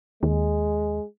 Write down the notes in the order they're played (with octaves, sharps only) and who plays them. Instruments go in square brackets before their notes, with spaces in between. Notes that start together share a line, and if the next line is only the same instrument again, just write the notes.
[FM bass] D#2 [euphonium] G#3